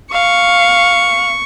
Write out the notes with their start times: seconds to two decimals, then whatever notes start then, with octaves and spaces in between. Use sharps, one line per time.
0.12 F5 C#6